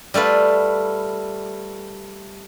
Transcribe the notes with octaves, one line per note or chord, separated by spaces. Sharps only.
G3 A3 F4 B4